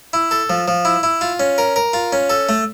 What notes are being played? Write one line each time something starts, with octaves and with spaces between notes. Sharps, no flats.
E4
A4
F3
F3
E4
E4
F4
C#4
A#4
A#4
F4
C#4
A4
A3